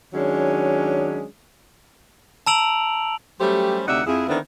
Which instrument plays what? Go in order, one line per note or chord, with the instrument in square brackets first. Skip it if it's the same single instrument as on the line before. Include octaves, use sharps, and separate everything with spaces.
[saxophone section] D#3 F#3 G#3 C#4 D4
[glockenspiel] A5 A#5 E6 D7 F7 F#7
[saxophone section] F#3 G3 A3 C#4 G4 C5
D2 C3 D#4 D5 E5 F#5
F2 E4 G#4
D3 D#3 B3 C4 D4 E4